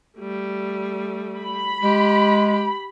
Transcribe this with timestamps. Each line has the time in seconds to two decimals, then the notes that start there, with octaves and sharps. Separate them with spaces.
0.18 G3 A3
1.40 B5
1.82 G#3 G4